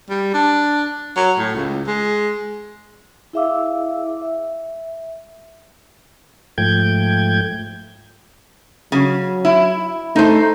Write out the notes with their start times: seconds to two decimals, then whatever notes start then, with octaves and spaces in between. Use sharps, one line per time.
0.10 G3
0.34 D4
1.16 F#3
1.38 A2
1.55 C#2
1.87 G#3
3.33 E4 G#4 E5 F5 D6 E6
4.22 E5
6.58 G#2 F3 A3 G5 G6 G#6
8.92 C#3 F#3
9.45 E4
10.16 A3 D#4 C5